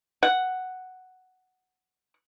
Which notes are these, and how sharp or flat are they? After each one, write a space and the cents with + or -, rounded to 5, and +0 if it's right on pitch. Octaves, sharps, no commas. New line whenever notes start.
F#5 +5